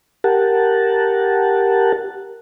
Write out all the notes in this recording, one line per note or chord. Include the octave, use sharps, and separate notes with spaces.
G4 A#4 F#5 A5